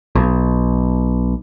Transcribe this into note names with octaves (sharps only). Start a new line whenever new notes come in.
B1